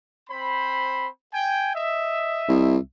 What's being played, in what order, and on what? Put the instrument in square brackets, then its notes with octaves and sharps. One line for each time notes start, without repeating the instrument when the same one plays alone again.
[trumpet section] C4 C5 B5
G5 G#5
D#5 E5
[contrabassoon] C2